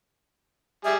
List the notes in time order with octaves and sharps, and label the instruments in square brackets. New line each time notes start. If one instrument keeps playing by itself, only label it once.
[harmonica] G3 G#4 [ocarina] E5